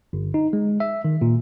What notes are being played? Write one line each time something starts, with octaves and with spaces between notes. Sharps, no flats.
G1
D#4
G#3
E5
D#3
A#2